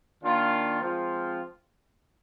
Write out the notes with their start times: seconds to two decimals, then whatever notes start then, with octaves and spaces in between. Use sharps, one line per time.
0.23 D#3 A#3 D4 F4
0.81 F3 G#3 C4 F4